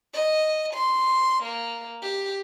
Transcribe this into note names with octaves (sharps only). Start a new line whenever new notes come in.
D#5
C6
A#3
G4